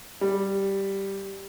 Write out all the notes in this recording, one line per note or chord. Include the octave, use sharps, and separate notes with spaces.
G3